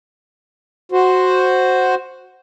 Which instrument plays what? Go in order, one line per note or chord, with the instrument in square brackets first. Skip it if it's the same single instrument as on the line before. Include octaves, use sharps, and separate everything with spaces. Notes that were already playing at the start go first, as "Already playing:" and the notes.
[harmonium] F#4 C5